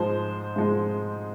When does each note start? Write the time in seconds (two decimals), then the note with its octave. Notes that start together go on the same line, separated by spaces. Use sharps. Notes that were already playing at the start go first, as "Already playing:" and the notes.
Already playing: G#2 F3 G#3 C5
0.56 G#2 F3 G#3